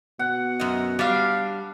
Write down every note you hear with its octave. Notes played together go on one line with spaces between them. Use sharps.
B2 F#5
F#2 D#5
G3 D4 F5